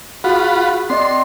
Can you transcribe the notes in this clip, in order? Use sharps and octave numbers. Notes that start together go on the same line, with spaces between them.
F4 F#4 G#4 F#5 B5
C4 D5 D#5 C6